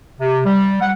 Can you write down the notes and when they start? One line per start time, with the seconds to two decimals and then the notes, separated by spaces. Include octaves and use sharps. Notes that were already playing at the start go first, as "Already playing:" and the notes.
0.19 C3
0.45 G3
0.81 F#5